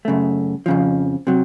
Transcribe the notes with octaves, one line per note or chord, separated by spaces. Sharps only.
F#2 C#3 A3
F2 C#3 F3
C3 F#3